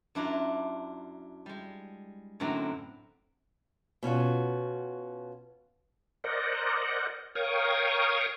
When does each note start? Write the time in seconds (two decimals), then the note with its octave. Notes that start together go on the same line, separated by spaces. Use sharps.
0.15 F#2 D4 E4 F4 A#5
1.46 G3 G#3
2.40 F#2 A2 D3 C4 A#5
4.03 B2 C#4 F4 F#4
6.24 A#4 C5 D5 D#5 F#5
7.35 A#4 C#5 F5 G5 C#6 D#6